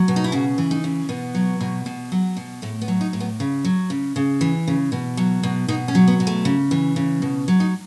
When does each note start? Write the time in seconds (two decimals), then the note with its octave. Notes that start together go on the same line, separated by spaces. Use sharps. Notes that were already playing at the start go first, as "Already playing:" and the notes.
Already playing: F#3
0.08 B2
0.16 D#4
0.24 E4
0.32 C#3 F#4
0.58 E3
0.71 D#4
0.84 C#3
1.09 B2 B3
1.35 F#3
1.61 B2
1.86 B2
2.12 F#3
2.37 B2
2.62 A2 A3
2.81 B3
2.88 F#3
3.01 D#4
3.13 A2
3.20 B3
3.40 C#3
3.65 F#3
3.90 C#3
4.16 C#3
4.41 E3
4.68 C#3
4.92 B2
5.17 F#3
5.43 B2
5.68 B2 D#4
5.88 C#4
5.95 F#3
6.08 B3
6.20 B2
6.27 A3
6.45 C#3
6.71 E3
6.96 C#3
7.22 B2
7.48 F#3
7.60 D#4